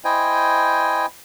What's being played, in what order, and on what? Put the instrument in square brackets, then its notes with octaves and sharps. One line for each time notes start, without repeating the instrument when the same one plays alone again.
[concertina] E4 C5 D#5 G5 G#5